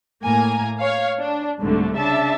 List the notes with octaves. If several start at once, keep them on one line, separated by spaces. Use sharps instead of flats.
A2 A#3 G#5 A#5
C#5 F5
D4
C2 G#2 D3 A3
C#3 D4 E5 A5